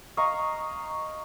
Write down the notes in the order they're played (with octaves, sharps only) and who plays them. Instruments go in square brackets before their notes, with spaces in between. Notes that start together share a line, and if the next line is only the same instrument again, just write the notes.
[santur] D#5 F5 A#5 C#6